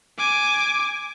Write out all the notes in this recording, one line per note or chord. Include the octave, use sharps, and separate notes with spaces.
G#5 D6